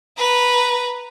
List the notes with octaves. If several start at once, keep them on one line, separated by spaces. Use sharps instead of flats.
B4 A#5